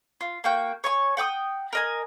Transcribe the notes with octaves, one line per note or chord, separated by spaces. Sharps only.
F4
A#3 F#4 G5
C#5 G#5 C#6
F#5 G5 D6 D#6
A#4 D#5 G#5